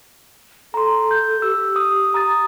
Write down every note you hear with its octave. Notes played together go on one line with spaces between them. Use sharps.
A4 A#5 C6
G6
G4 E6
D#6
A#5 D#6 A6